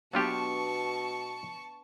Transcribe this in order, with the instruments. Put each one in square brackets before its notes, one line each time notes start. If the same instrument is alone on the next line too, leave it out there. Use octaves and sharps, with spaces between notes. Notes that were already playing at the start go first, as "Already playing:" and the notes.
[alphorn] B2 [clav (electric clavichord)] F#3 F4 G4 [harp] B3 D4 [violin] A5 C#6